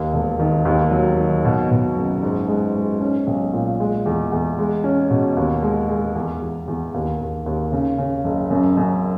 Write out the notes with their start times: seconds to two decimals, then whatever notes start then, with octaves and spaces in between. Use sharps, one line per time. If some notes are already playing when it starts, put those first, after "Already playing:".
Already playing: D#2
0.13 E1
0.39 D#3
0.65 D#2
0.91 F#3
1.18 D#3
1.45 B2
1.70 B2
1.96 F#1
2.23 G#2
2.48 G#3
2.75 G#3
3.01 C#4
3.27 B1
3.53 A#2
3.80 G#3
4.06 E2
4.32 E2
4.58 G#3
4.84 C#4
5.10 B2
5.37 D#2
5.62 G#3
5.89 G#3
6.15 E2
6.41 E2
6.68 E2
6.94 D#2
7.20 D#2
7.46 D#2
7.72 C#3
7.98 C#3
8.24 F#1
8.51 F#2
8.77 F#2